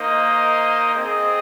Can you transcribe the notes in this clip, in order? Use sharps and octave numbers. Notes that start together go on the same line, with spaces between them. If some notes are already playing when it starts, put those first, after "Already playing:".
Already playing: A#3 D#4 C5 D#5
C4 G#4 D#5